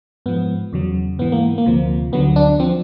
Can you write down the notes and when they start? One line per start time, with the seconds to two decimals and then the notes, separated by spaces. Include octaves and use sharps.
0.26 G#2 F3 B3
0.73 E2 C#3 F#3
1.19 G#2 E3 B3
1.32 A#3
1.58 A#3
1.66 D2 C3 F3
2.12 D2 D3 F#3 B3
2.36 D4
2.60 F3 C4